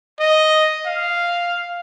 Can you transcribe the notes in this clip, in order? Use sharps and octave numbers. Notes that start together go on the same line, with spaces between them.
D#5
F5